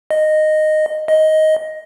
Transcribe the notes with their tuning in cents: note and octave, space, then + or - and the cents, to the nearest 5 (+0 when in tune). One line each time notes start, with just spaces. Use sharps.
D#5 -10
D#5 +10